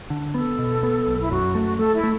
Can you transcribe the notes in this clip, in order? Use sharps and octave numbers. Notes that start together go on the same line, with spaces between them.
D3
B3 A4
B2
B3
B1
E4
F#2 F#4
A3
A3 A4
E4
A3